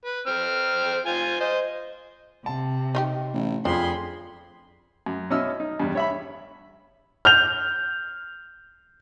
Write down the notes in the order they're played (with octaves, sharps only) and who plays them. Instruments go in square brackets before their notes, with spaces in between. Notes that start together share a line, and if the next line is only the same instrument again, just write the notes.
[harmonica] B4
C4 F6
F4 C5 G#5
C5 D#5
[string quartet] C3 [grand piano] A5
[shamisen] D#4 F4 G4
[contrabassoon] A1
[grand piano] F2 [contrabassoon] F3 [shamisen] D4 [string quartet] G#4 B5 C6
[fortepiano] F#2
B2 C#4 E4 D#5 E6 F6
D#4
E2 G2
C#5 E5 B5
[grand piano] F6 G6 F7